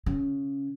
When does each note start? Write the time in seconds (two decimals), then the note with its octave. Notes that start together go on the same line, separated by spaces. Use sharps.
0.06 C#3